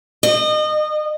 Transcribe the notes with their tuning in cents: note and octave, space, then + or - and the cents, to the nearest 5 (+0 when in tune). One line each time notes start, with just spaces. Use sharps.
D#5 -30